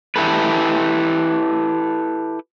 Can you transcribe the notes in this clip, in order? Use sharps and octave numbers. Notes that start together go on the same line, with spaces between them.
E4 G4 A4 B4